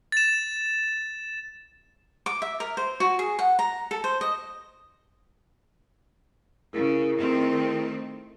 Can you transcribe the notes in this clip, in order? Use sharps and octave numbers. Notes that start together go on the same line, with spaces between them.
A6 E7
D6
E5
A#4
C5
F#4
G#4
F#5
A#5
A4
C5
D#5
C#3 E4 G#4 A#4
D#3 A3 C4